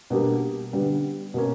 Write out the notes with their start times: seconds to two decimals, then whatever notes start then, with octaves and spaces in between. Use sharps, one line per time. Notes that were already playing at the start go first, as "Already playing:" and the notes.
0.10 B2 G3 A#3 D4 G4
0.73 D3 G3 B3
1.34 B2 A#3 C#4